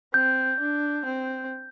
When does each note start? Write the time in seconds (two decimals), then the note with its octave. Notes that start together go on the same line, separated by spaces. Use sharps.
0.14 C4 G6
0.60 D4
1.05 C4